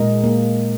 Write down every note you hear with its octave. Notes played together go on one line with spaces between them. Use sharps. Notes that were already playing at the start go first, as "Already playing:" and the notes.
Already playing: A#2 G#3 A#4 D#5
A#3